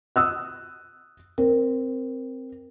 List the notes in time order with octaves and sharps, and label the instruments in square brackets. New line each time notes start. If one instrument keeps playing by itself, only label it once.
[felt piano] D#6 E6 F#6
[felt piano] C4 [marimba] A#4